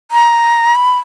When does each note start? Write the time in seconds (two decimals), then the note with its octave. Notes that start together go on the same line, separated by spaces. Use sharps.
0.11 A#5
0.75 B5